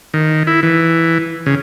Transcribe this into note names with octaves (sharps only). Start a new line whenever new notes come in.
D#3
E4
E3
C#3